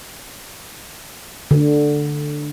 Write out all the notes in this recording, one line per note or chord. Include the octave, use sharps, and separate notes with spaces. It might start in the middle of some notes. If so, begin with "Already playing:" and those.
D3